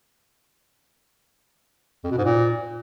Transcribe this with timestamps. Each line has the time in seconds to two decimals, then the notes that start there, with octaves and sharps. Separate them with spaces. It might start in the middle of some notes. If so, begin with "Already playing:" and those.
2.04 F2
2.11 B2
2.18 G#2
2.25 A#2